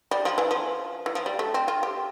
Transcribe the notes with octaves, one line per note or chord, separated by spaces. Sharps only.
G3
F3
E3
F3
E3
F3
G3
A3
C4
F4
G4